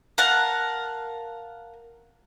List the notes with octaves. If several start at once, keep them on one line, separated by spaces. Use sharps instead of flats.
A#4 F5 F#5 A5